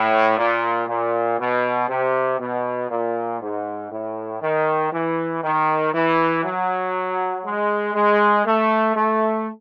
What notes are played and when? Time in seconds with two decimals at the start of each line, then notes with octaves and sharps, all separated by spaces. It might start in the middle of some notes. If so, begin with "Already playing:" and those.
Already playing: A2
0.38 A#2
0.88 A#2
1.39 B2
1.89 C3
2.39 B2
2.90 A#2
3.41 G#2
3.92 A2
4.42 D#3
4.92 E3
5.43 D#3
5.94 E3
6.44 F#3
7.45 G#3
7.95 G#3
8.46 A3
8.96 A3